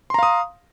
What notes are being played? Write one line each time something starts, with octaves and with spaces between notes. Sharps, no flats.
F5 A#5 C6 D#6